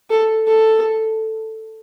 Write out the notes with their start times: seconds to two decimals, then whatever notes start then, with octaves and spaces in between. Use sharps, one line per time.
0.10 A4
0.47 A4